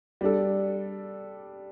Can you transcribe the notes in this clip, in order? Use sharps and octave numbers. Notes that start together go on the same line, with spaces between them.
G3 D4 A4